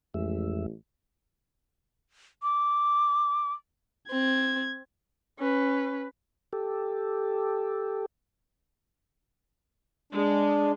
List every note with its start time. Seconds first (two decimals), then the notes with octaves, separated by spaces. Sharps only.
0.14 A1 F2 G#3 E5
2.43 D6
4.10 C4 G#6
5.39 C#4 B4
6.53 G4 A4
10.13 G#3 D4